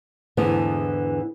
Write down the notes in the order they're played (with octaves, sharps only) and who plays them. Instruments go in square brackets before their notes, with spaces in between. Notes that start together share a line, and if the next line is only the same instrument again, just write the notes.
[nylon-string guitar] E2 G#2 D3 E3 B3